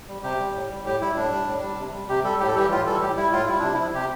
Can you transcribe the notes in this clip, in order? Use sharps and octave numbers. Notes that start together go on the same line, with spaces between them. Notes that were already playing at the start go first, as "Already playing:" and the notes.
G3
C3 G4
G3
A2
G3
A2 G4
G3 E4
A2 D4
G3
A2
G3
C3
G3
C3 G4
G3 A4
A2 G4
A4
E3 G3 G4
A2 F4
E3 G3 A4
A2 G4
G3 E4
A2 F4
G3 E4
C3 D4
E4
F3
C3 G4